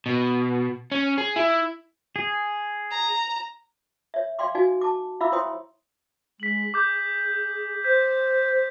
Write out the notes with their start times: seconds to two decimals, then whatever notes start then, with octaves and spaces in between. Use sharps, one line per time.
0.06 B2
0.92 C#4
1.18 G#4
1.36 E4
2.16 G#4
2.91 A#5
4.14 C#5 E5
4.39 D5 F5 G5 C6 D6
4.55 D#4 F#4 D5 F5 G#5
4.81 A5 D6
5.20 E4 E5 F5 B5 D6 E6
5.32 E4 C5 C#5 G5 C6 D#6
6.40 G#3 B6 F#7
6.74 G#4 D6 G6
7.84 C5 G6 B6